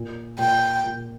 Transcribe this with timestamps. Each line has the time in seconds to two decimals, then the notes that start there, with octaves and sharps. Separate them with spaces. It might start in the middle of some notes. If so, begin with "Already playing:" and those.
Already playing: A#2
0.38 A#2 G5
0.84 A#2